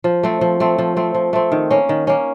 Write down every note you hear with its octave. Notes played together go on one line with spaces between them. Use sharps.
F3
A3 C4
F3
A3 C4
F3
A3 C4
F3
A3 C4
D#3
A#3 C#4
D#3
A#3 C#4